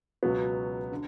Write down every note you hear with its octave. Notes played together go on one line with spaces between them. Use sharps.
C#2 B2 F#3 B3
D3